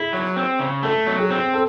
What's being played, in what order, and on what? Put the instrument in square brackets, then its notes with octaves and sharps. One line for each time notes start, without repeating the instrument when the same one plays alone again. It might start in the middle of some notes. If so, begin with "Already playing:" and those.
Already playing: [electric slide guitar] E4 [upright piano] G#4
[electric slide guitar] F#3
C4
C#3
[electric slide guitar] A3 [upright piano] A4
[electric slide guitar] F#3
[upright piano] G#4
[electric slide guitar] C4
[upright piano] A4